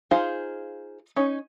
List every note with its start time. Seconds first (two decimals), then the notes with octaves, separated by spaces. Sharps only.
0.11 D#4 F4 G#4 C5 F5
1.16 C#4 D#4 C#5